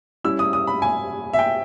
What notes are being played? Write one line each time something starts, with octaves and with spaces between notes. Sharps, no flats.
G3 C#4 E4 E6
D#6
D#6
B5
G#5
E5
G5